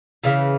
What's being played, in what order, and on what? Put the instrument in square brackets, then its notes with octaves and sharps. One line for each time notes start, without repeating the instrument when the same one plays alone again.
[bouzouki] C#3 E3